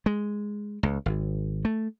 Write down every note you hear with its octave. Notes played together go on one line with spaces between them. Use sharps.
G#3
C#2
G#1
A3